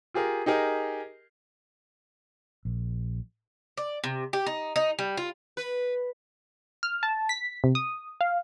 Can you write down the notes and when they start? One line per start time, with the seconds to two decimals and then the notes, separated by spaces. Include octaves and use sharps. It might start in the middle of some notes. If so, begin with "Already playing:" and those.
0.14 F4 G4 G#4 A#4
0.46 D#4 G4 G#4 A#4
2.65 A#1
3.78 D5
4.04 C3
4.33 G4
4.46 D#4
4.76 D#4
4.99 G3
5.17 F4
5.57 B4
6.83 F6
7.03 A5
7.29 B6
7.64 C3
7.75 D#6
8.21 F5